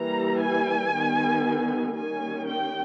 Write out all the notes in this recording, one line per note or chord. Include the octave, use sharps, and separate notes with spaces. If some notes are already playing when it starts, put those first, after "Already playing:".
Already playing: E3 G3 A#3 A#5
G#5
D#3 G3 B3
D#3 G3 A#3 C#4 G#5
G5